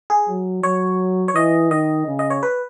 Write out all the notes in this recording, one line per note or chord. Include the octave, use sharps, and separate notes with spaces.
G#4
F#3
F#3 C#5
C#5
E3 D#5
D#3 D#5
C#3
D#5
C#5
B4